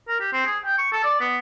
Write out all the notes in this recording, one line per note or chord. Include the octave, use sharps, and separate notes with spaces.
A#4
G4
C4
G#4
G5
C#6
A4
D5
B3